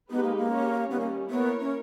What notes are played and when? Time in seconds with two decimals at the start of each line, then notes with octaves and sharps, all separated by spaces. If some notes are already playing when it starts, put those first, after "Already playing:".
0.10 G#3 B3 D#4 G4 B4
0.23 A#3
0.37 A#3
0.51 C#4 G4 C#5
0.90 D#3 G3 B3 C#4
1.00 A#3
1.30 A#3 B3 E4 A#4 C#5
1.60 C#4